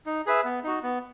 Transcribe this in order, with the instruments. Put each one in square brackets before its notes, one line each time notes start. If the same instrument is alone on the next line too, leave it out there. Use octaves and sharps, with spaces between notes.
[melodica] D#4
G#4 B4 E5
B3
D#4 F#4
B3